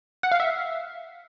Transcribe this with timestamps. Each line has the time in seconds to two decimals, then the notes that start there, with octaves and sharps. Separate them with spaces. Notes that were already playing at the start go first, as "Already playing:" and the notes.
0.23 F#5
0.32 F5
0.40 E5